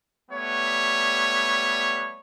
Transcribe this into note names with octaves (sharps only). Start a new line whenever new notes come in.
G3 A3 B3 C#5